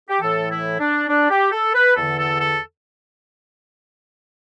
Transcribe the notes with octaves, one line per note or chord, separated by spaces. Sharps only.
G4
A2 E3 A4
E4
D4
D4
G4
A4
B4
E2 D3 A4
A4
A4